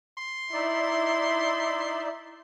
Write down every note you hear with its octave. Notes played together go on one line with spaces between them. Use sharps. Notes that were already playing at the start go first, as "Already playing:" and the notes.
C6
D#4 E4 D5 E5